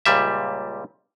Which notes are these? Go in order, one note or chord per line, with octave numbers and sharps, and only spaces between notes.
C#2 A#2 G3 E5